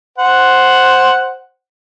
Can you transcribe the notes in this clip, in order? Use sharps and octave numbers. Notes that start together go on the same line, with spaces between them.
C5 F#5